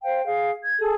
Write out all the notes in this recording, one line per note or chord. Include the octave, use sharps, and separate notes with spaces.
C5 F5 G5
G#4 F5
G#6
G#4 A4